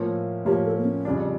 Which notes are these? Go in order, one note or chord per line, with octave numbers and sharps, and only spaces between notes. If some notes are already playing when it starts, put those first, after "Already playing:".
Already playing: A2 F3 A#3 C#4
A2 F3 A#3 C#4 G4
A4
A#3
C#4
F2 C#3 G3 D4